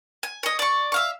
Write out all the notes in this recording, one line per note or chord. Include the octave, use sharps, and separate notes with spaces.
G#5
C#5 D#5
D5 C#6
E5 F5 C#6